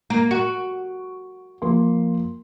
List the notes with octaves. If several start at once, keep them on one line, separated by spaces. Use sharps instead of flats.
A#3 D7
F#4
F3 A#3 C6